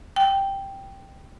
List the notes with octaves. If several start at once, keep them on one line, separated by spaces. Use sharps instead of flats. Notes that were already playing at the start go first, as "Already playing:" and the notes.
G5